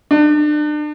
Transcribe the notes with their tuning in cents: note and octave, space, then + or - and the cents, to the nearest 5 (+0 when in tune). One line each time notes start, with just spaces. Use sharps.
D4 +35